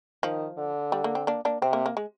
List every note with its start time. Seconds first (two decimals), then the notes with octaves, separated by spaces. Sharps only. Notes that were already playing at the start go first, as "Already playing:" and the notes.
0.23 D#3 F3
0.58 D3
0.92 G3
1.04 A#3
1.15 C4
1.27 A#3 D4
1.45 A#3 D4
1.62 C3 C4
1.73 A#3
1.86 A#3
1.97 G#3